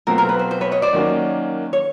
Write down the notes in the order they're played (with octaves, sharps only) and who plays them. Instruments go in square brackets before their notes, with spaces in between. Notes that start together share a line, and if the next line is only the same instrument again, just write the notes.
[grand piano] B2 F#3 A3 C4 F4 [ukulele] A#4
[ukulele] A#4
B4
C5
C5
B4 C#5
C#5 D#5
C5 D5
[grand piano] D#3 F#3 A#3 C#4 F#4
[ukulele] C#5